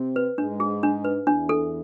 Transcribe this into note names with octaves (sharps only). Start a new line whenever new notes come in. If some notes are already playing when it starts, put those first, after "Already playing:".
Already playing: C3 C4
B4
G#2 G#3 D4
G#4
D4
B4
E2 E3 D4
A4